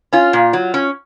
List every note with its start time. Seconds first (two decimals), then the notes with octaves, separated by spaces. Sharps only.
0.13 C#4 F4
0.33 A#2
0.53 F#3
0.74 C#4